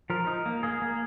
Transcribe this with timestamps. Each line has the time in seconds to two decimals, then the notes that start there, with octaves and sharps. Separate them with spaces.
0.10 F3 A#4
0.27 D#4
0.46 A#3
0.63 A#3 G#4
0.82 A#3